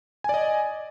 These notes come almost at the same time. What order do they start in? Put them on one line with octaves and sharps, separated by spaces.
G#5 D5 D#5